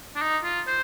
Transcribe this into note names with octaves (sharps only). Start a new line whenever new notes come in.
D4
D#4
F4
C5